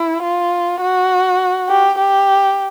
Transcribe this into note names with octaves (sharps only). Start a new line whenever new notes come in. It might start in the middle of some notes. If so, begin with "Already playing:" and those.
Already playing: E4
F4
F#4
G4
G4